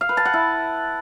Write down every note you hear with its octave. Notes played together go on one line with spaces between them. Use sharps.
F5
B4
A5
F#5
E4